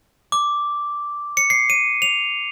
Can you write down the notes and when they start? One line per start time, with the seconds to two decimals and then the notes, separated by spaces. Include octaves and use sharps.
0.32 D6
1.37 C#7
1.50 C7
1.70 D#7
2.02 F7